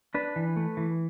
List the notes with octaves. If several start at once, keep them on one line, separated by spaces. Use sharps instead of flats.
D4 B4
E3
A3
E3